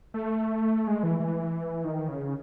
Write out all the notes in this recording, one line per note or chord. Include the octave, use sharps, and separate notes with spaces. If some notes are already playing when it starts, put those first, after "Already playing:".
A3
G#3
E3
E3
D#3
C#3